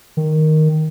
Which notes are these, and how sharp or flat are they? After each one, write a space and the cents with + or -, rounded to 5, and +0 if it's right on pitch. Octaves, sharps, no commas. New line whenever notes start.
D#3 +0